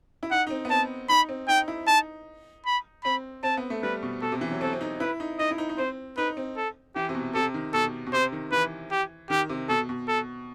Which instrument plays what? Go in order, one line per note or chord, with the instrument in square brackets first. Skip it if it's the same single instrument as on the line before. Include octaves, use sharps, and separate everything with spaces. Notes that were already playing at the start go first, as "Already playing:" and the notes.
[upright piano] E4
[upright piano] D#4 [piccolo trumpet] F#5
[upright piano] D#4
C4
B3
[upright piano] C4 [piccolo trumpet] A5
[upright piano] D#4 [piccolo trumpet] B5
[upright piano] C4
[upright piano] D#4 [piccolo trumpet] G5
[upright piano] E4
[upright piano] D#4 [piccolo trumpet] A5
[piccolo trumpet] B5
[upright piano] C4 [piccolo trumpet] B5
[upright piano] C4 [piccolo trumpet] A5
[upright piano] B3
A3
[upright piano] G3 [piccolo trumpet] B4
[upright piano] B2
[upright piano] B2 [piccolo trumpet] A4
[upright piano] C3
E3
F#3
[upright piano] C4 [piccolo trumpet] A4
[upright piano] C4
D#4
[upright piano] E4 [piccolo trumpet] B4
[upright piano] D#4
[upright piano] D#4 [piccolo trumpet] D#5
[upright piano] E4
D#4
D#4
[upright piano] C4 [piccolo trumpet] C5
[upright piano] D#4 [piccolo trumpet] B4
[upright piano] C4
[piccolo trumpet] A4
[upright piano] E3 [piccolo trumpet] G4
[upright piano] C3
B2
[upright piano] C3 [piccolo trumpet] A4
[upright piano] D#3
[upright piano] B2 [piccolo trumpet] A4
[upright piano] B2
[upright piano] C3 [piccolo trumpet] C5
[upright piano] D#3
[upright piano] E3 [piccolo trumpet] B4
[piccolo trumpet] G4
[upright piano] D#3 [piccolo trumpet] G4
[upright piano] C3
[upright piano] B2 [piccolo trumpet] A4
[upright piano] B2
[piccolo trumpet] A4